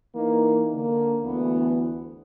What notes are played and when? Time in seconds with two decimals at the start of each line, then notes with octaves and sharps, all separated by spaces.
0.15 E3 A#3 D#4
0.73 D3 A#3
1.24 D2 E3 B3